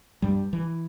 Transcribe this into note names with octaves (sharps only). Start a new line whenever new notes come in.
G2 G3
E3